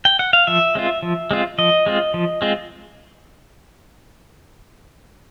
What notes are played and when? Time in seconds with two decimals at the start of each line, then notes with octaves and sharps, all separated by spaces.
0.05 G5
0.19 F#5
0.33 F5
0.47 F3 E5
0.75 G#3 C4 F4
1.03 F3
1.31 G#3 C4 F4
1.58 F3 D#5
1.86 G#3 C4 F4
2.14 F3
2.42 G#3 C4 F4